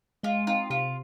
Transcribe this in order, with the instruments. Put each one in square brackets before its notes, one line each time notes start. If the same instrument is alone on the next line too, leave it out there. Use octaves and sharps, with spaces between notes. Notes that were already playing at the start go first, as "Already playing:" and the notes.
[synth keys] G#3 [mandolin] F4
[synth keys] C4 D#4 [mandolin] F4
[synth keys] C3 [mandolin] F4